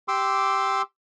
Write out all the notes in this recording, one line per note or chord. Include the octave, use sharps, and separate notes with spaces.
G4 C6 D6 E6